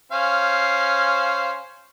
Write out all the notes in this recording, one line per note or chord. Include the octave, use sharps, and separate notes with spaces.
C#4 C5 F5